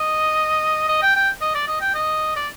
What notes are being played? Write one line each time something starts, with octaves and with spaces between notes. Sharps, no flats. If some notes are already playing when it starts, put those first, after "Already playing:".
Already playing: D#5
D#5
G5
G5
D#5
D5
D#5
G5
D#5
D5